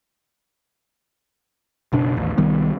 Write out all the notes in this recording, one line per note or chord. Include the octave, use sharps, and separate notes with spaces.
F#1 B2 D4
A1 D#2
C2 D#3 G3 B3